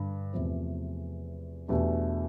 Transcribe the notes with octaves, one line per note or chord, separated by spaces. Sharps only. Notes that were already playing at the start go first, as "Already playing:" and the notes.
Already playing: G2 D3
E2 C3 F3 A3 C4
E2 B2 A3 D4 G4